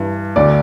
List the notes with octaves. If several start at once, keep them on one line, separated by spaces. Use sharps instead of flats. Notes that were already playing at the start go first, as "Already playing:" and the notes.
Already playing: G2 E3
D2 D3 D5